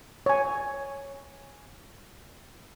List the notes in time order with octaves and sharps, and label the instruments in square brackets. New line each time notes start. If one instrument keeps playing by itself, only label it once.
[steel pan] C#5 G#5